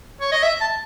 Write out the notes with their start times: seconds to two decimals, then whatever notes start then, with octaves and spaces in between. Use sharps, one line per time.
0.21 C#5
0.32 D#5
0.43 E5
0.61 A5